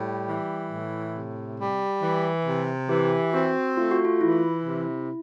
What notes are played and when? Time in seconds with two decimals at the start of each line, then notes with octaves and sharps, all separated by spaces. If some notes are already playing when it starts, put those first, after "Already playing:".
Already playing: A2 G3
0.26 E3
0.70 A2
1.14 C3
1.58 G3
2.02 E3
2.45 C3
2.89 E3 G4
3.33 C4 F#4
3.77 A3 F4
3.91 F#4
4.05 F4
4.21 E3 E4
4.65 C3